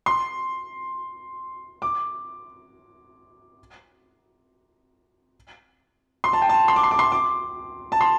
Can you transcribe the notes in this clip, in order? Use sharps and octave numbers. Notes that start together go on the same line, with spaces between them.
C6
D6
C6
A5
G5
A5
C6
D6
C6
D6
C6
D6
A5
C6